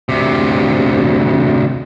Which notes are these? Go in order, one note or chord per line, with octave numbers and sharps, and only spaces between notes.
D2 C3